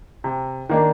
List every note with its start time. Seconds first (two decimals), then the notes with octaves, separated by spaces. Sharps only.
0.24 C3
0.69 D#3 A#3 D4